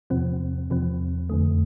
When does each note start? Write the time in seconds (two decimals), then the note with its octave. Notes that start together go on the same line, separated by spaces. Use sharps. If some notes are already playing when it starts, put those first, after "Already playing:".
0.10 E2 C3 F3 C4
0.70 E2 C3 F3 C4
1.30 F2 D3 A3